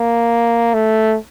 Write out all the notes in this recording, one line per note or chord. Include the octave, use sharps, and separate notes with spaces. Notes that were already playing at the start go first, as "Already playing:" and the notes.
Already playing: A#3
A3